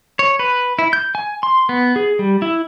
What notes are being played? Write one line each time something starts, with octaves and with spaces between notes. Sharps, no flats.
C#5
B4
E4
G6
G#5
C6
B3
G#4
G3
E4